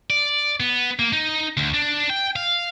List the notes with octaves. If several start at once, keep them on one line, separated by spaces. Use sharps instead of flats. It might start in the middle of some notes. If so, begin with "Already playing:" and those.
D5
B3
A#3
D#4
D2
D4
G5
F5